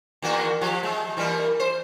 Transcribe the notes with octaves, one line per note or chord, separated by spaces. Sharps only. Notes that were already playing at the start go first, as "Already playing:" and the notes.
D#2 A#3 F#4
F3 G4
G#3
E3 G3 A#3
C5